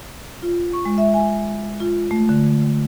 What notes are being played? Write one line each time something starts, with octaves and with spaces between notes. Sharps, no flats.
F4
C#6
G#3
E5
G#5
F4
A3
D3